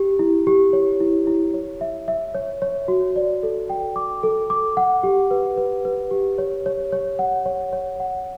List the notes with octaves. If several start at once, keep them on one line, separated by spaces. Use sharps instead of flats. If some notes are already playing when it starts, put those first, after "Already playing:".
Already playing: G4
E4
G4
C#5
E4
E4
C#5
E5
E5
C#5
C#5
F#4
D5
A4
G5
D6
A4
D6
F#5
G4
B4
B4
B4
G4
C#5
C#5
C#5
F#5
C#5
C#5
F#5